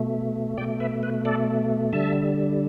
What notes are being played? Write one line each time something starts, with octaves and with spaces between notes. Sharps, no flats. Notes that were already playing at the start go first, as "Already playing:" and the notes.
Already playing: B2 A3
B2 A3 D5 G5
B4 E5
B4
A4 D5
D3 G3 E5 A5